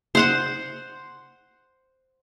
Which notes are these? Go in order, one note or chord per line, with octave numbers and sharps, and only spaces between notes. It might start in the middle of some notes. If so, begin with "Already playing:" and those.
C5 F#5 C6